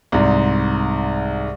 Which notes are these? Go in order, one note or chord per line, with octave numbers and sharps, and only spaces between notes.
C2 G#2